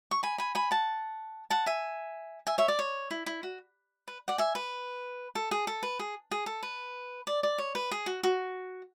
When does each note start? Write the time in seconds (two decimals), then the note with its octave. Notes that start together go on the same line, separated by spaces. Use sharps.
0.11 C#6
0.23 G#5 B5
0.38 G#5 B5
0.55 G#5 B5
0.71 F#5 A5
1.50 F#5 A5
1.66 E5 G#5
2.47 E5 G#5
2.58 C#5 E5
2.68 D5
2.79 C#5
3.11 E4
3.26 E4
3.43 F#4
4.08 B4
4.28 D5 F#5
4.38 E5 G#5
4.55 B4
5.35 A4
5.51 G#4
5.67 A4
5.83 B4
5.99 G#4
6.31 G#4
6.46 A4
6.63 B4
7.27 D5
7.43 D5
7.58 C#5
7.75 B4
7.91 G#4
8.06 F#4
8.23 F#4